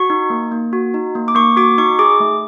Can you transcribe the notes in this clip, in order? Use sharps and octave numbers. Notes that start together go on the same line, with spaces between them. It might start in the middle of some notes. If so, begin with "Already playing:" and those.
Already playing: F#4 C#6
D#4
A#3
A#3
F#4
D#4
A#3
D6
A#3 C#6
F#4 D6
D#4 C#6
G#4 D6
A3